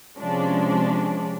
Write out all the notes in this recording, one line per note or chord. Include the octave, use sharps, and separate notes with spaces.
C3 F3 G#3 C#4 D4